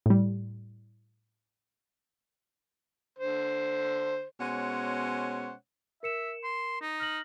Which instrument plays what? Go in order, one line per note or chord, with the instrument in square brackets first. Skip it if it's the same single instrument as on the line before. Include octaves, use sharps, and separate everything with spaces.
[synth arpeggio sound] A2 G3
[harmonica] D3 C5
[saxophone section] B2 G#3 C#4 C5 C#5 F#5
[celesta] A#4 C#7 E7 [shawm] E5
[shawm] C6
D#4
[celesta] F6 A#6 F#7